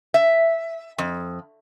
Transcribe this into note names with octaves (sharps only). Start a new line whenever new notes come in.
E5
F2